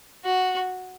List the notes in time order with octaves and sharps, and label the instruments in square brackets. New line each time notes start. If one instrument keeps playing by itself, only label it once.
[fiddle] F#4